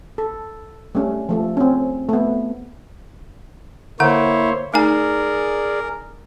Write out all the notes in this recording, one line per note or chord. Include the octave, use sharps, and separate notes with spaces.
A4
G3 A3 C#4
F3 A3 A4
C4 C#4
A3 B3
D3 A#3 E4 C5 C#5 F#5
A3 D#4 G#4 A#4 D5 G#5